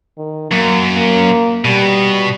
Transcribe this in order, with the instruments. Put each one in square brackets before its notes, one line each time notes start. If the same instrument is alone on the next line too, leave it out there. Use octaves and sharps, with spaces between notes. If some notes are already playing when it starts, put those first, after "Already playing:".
[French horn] D#3
[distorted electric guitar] F#2 [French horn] A#3
[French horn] A#3
[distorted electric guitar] B2 [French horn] G3